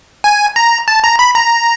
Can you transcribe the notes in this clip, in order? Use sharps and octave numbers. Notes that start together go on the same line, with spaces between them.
G#5
A#5
A5
A#5
B5
A#5